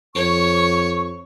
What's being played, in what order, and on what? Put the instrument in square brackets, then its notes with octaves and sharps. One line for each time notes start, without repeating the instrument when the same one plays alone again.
[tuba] F2 [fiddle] C#5 [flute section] C#6